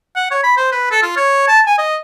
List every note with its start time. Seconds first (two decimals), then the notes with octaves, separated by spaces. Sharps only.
0.16 F#5
0.31 C#5
0.43 B5
0.57 C5
0.72 B4
0.91 A4
1.02 F4
1.17 C#5
1.48 A5
1.67 G#5
1.78 D#5